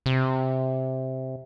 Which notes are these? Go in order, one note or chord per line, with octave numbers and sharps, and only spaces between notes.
C3